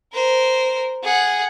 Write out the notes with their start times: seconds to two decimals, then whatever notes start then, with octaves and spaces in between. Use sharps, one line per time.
0.13 A#4 C5
1.03 G#4 F#5